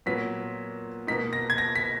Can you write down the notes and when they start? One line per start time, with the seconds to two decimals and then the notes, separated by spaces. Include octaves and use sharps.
0.06 A#2 F#3 B3 B6
1.07 B2 A#3 D#4 B6
1.33 A#6
1.50 G#6
1.58 A#6
1.75 B6